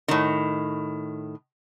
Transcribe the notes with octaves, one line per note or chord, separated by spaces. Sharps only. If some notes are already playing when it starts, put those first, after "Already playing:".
A2 D#3